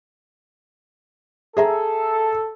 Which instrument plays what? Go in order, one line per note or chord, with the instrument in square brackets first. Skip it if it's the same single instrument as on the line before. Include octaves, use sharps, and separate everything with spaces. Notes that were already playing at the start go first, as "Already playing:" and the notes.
[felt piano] G#4 E5 A#5 [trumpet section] A4